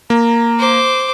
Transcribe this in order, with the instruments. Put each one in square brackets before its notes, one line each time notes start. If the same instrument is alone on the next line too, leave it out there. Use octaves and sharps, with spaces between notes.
[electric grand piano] A#3 [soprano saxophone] A#5
[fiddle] C5 D6